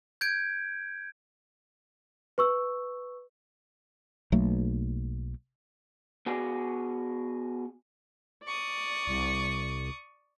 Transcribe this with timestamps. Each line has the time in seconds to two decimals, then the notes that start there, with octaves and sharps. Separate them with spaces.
0.21 G6 G#6 D7
2.38 B4 C#6 E6
4.32 B1 F#3 A3 A#3
6.26 B3 F#4 G#4 D5
8.46 D5 C#6 D#6
9.07 C2